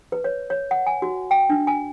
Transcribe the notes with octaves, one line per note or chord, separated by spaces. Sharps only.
B4
C#5
C#5
F#5
G#5
F#4
G5
D4
G#5